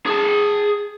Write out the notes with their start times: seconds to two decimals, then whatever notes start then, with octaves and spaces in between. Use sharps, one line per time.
0.06 G#4 A5